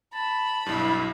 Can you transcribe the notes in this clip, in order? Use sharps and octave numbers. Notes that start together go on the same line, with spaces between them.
A5 B5
B1 G2 E4